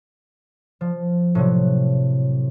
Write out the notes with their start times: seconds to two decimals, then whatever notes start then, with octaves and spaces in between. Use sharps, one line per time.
0.81 F3
1.35 A2 C3 F#3